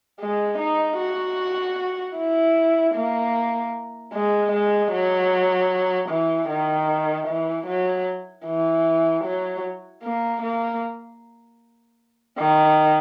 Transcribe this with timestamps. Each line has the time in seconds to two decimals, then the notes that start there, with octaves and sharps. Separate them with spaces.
0.20 G#3
0.58 D#4
0.98 F#4
2.16 E4
2.95 A#3
4.13 G#3
4.52 G#3
4.92 F#3
6.10 E3
6.49 D#3
7.28 E3
7.67 F#3
8.46 E3
9.24 F#3
10.03 A#3
10.42 A#3
12.39 D#3